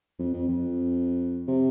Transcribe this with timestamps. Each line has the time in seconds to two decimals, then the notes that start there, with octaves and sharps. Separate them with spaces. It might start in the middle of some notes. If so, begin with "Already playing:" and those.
0.19 F2
0.34 F2
0.48 F2
1.48 C3